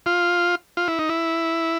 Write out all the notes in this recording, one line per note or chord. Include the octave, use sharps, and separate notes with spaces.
F4
F4
E4
D#4
E4